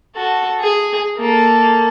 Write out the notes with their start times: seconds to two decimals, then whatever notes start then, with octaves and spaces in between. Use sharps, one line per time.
0.16 F#4 A4
0.60 G#4
1.17 A#3 A4